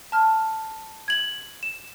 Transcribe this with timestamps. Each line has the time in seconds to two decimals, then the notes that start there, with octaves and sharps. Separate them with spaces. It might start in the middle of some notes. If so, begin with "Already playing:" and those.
0.12 A5 F6
1.08 G#6 F#7
1.63 E7